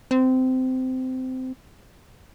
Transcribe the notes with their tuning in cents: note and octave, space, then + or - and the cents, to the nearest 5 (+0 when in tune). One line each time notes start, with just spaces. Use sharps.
C4 -20